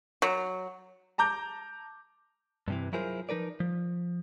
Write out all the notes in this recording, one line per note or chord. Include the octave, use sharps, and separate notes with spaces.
F#3
A5 A#5 D6 G6
G2 C3 E3
F#3 E4 F4 G#4 A#4 C5
F3 D#4 A#4 B4 D5
F3